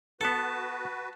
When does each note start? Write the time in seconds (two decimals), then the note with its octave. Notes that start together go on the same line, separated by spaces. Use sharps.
0.21 B3 F#4 A4 B4 A5